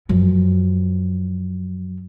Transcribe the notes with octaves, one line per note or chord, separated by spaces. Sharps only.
F#2 F3